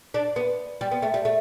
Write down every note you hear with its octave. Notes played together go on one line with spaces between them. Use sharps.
D4
B3
G3
B3
A3
G3
A3